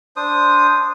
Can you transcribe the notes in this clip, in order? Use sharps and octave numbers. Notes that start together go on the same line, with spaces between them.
D4 C5 D#6